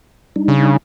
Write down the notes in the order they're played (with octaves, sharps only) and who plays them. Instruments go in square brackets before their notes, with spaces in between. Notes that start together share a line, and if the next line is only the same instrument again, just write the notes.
[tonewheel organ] G3 D4 D#4
[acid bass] C#3